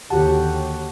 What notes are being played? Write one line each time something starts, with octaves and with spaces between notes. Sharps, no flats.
D#2 D3 F#4 G4 F#5 A5